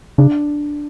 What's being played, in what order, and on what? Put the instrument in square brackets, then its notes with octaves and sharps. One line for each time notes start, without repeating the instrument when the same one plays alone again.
[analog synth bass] C#3 [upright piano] D4